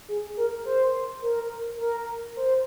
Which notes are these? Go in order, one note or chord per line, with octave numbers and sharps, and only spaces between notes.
G#4
A#4
C5
A#4
A#4
C5